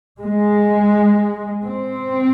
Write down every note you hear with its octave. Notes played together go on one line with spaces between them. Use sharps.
G#3
C4